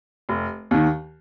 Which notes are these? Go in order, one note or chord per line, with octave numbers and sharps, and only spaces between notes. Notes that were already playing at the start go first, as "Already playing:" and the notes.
F1
D#2 D#3